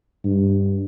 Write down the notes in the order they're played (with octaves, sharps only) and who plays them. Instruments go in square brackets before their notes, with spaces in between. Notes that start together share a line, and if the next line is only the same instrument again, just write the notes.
[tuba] G2